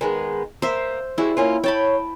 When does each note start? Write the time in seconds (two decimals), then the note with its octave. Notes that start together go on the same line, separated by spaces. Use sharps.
0.01 D#3 G#3 B3
0.62 A#3 C5 E5
1.18 G3 G#3 E4 F#4
1.37 A#3 C#4 F4
1.64 C#5 G5 A5 B5